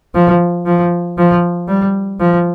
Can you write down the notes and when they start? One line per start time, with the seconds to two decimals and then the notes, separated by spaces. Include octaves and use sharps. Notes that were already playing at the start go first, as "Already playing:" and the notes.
0.15 F3
0.66 F3
1.18 F3
1.68 G3
2.20 F3